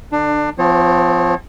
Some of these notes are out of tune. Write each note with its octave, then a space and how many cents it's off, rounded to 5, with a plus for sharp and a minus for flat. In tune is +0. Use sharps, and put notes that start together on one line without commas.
D3 +0 D4 +25
F3 -5 C4 -35 C#5 -40